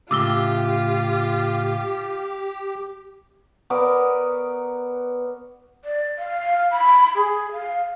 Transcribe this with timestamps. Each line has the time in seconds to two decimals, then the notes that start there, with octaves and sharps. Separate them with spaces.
0.11 A2 C#3 F4 G4 D6 E6 G7
3.70 B3 A#4 C#5 D5
5.85 D5
6.19 F5
6.72 B5
7.15 G#4
7.53 F5